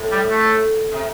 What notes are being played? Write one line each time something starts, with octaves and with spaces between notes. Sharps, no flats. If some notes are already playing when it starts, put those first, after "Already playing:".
Already playing: A2
G3
A3
C3